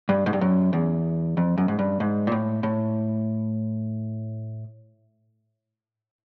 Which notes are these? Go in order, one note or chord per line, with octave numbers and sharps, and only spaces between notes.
G2
G#2
G2
F#2
E2
F2
F#2
G#2
G2
G#2
A#2
A2
A2